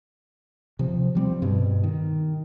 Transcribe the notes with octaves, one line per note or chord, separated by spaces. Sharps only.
C3 F3
F3 G3 C4
G2 B2
D#3